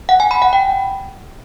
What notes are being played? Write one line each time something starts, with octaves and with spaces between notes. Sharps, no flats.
F#5
G#5
B5
F#5
G5